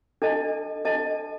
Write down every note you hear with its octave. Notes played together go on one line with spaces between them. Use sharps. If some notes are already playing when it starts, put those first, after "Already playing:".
D4 A4 D#5 A5
D4 A4 D#5 A5